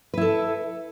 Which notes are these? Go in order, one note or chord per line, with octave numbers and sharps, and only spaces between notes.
E4 A4 B4